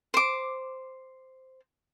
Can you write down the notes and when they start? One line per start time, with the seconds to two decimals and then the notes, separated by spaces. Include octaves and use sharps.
0.14 C5 D6